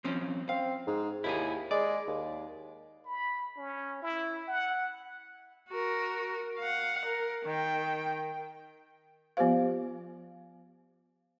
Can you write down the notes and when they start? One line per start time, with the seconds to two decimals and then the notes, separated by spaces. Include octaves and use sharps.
0.04 F3 C4 C#4
0.49 C4 F5
0.87 G#2
1.24 D#2 E4 G4 G#4
1.71 G#3 D5
2.07 D#2
3.06 B5
3.57 C#4
4.02 E4
4.48 F#5
5.70 F#4 A#4
6.59 F5 F#5
7.06 A#4
7.46 D#3 G5
9.37 F3 B3 F4 G4 C5 F5